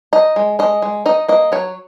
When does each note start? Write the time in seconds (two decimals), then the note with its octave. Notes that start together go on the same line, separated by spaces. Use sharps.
0.13 D#4 D#5
0.36 G#3
0.59 G#3 D#5
0.82 G#3
1.06 D#4 D#5
1.28 A#3 D#5
1.52 F#3 C#5